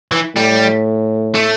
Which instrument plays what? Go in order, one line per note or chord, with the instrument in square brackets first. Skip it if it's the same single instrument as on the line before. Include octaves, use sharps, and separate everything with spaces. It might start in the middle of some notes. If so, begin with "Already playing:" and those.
[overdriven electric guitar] E3
[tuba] A2 [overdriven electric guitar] G3
[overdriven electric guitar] A3